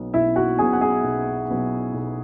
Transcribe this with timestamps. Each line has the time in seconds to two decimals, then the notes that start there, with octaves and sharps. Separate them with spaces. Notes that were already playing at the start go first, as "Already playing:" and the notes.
Already playing: B1 B2 F#3 B3
0.14 B1 E4 E5
0.36 F#4 F#5
0.58 B2 F#3 B3 G#4 G#5
0.73 F#5
0.81 G#4 G#5
1.04 B1
1.50 B2 F#3 B3
1.94 B1